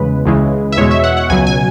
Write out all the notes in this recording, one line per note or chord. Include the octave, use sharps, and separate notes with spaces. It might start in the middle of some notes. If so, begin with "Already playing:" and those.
Already playing: E2 C#3 G#3 B4
C#2 C#3 E3 G#3
E5
E2 B2 G#3 C#5
E5
F#5
F#5
C#2 B2 F#3 G#5
G#5